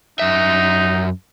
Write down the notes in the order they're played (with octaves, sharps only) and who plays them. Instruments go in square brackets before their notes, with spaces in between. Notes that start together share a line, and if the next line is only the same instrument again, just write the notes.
[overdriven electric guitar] F#2 E5 [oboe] D#4